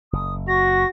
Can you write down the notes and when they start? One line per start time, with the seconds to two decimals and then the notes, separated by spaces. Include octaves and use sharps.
0.13 F#1 D#6
0.48 F#4 C#6 A#6